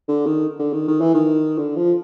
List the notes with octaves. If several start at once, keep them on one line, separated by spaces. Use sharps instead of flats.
D3
D#3
D3
D#3
D#3
E3
D#3
D3
F3